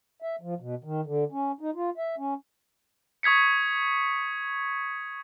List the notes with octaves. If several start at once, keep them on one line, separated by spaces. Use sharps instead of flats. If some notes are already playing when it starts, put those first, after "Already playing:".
E5
F3
B2
D#3
D3
C#4
D#4
F4
E5
C#4
C#6 D#6 G#6 B6 C#7